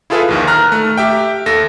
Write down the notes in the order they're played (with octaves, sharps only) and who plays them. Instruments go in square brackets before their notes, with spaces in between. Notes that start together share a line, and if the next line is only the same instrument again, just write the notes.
[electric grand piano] E4 F4 G#4 A4 B4 F5
A#1 D#2 D#3
A#5 F6 F#6
A3
G4 E5 G5
D#2 A4 A#6